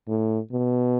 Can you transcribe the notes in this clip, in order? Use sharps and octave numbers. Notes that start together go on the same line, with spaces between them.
A2
B2